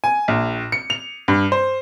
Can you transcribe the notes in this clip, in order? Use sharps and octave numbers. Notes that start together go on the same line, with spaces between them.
G#5
A#1
C#7
F7
G2
C5